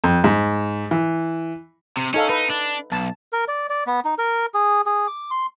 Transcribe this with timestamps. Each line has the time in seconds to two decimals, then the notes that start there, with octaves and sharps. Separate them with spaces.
0.04 F2
0.24 G#2
0.91 E3
1.97 C3
2.14 C#4 D#4 A4 F5
2.29 D#4 B4
2.50 D4
2.92 B1 A5
3.33 A#4
3.48 D5
3.70 D5
3.87 B3
4.05 D#4
4.18 A#4
4.54 G#4
4.86 G#4
5.07 D6
5.31 C6